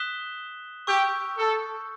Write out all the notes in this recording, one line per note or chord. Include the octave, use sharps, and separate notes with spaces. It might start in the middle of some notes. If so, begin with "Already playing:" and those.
Already playing: D#6 F#6 B6 E7 G7
G4 C#6 E6 G6
A4